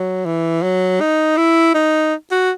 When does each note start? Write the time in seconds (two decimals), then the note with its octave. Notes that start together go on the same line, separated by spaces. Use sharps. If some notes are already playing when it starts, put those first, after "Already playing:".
Already playing: F#3
0.25 E3
0.62 F#3
1.01 D#4
1.37 E4
1.75 D#4
2.31 F#4